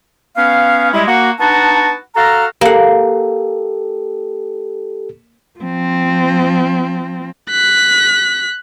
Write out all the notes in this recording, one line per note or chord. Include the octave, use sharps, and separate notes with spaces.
B3 C#4 F5
G3 G#3 E4
A#3 F#4
B3 D4 D#4 F#4 A5
F#4 A4 F5 A5 A#5
A#3 G4 A4 F#5
F3 C4
F#6 B6